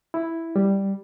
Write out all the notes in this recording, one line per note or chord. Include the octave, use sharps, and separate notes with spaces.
E4
G3